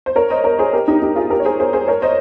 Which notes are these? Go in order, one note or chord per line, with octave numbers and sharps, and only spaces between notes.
C5
A#4 C#5
C5 D#5
A#4 C#5
G#4 C5
G4 A#4
D#4 G4
D#4 G4
F4 G#4
G4 A#4
C#5
G#4 C5
G#4 C5
G#4 C5
A#4 C#5
C5 D#5